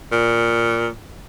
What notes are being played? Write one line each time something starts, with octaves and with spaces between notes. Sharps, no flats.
A#2